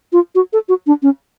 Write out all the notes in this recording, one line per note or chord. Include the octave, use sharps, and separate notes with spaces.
F4
F#4
A4
F#4
D4
C#4